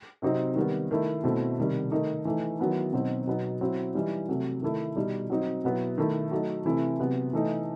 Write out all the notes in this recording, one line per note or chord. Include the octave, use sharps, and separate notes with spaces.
C3 F#3 C4 D#4
D#3 G3 B3
D#3 A3 E4
B2 A3 C4 E4
C3 D#3 G3
D#3 A3 D#4
E3 A3 D#4
D#3 F#3 B3 E4
B2 F#3 C4 D#4
B2 F#3 B3 D#4
F#3 C4 E4
E3 G3 D#4
C3 F#3 A3
D#3 A3 E4
B2 G3 D#4
F#3 C4 D#4
B2 F#3 B3 E4
D#3 A3 E4
F#3 A3 D#4
C3 E3 A3 E4
C3 F#3 B3
E3 A3 D#4